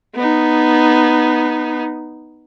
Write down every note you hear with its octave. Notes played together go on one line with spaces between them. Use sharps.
B3 D#4